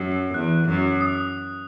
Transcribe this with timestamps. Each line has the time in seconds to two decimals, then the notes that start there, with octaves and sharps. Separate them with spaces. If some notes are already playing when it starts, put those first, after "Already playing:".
Already playing: F#2
0.34 E2 F#6
0.68 F#2
1.01 D#6